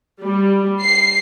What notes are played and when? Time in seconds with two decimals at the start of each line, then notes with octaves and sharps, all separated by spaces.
0.21 G3
0.82 C7